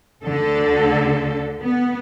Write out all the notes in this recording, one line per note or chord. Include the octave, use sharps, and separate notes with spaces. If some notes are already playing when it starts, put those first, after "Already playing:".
D2 D3 A4
B3